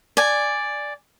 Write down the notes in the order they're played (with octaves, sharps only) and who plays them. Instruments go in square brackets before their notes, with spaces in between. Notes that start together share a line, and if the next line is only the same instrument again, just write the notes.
[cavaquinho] D5 G#5